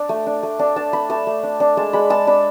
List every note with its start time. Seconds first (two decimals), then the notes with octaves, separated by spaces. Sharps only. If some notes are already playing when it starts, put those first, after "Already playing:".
Already playing: D4
0.09 A3
0.26 D4
0.43 A3
0.59 D4
0.76 D4 A5
0.93 A3 B5
1.10 A3 A5
1.27 A3
1.43 D4
1.60 D4
1.77 G#3 A5
1.93 G#3 B5
2.10 G#3 A5
2.27 D4 B5